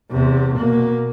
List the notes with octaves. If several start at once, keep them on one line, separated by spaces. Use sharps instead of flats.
E2 C3
B2 A#3